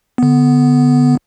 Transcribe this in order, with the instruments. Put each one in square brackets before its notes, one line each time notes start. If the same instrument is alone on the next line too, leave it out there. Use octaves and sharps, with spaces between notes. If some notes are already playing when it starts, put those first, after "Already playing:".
[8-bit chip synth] D3 B3